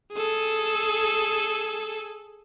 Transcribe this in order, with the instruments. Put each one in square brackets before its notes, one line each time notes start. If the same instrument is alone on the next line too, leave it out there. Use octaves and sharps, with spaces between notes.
[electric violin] G#4 A4